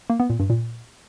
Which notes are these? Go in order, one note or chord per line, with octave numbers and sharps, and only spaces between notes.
A#3
B3
A#2
G2
A#2